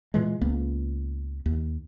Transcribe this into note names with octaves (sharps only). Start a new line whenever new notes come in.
A#2 E3 G#3
C#2 A#3 B3
D#2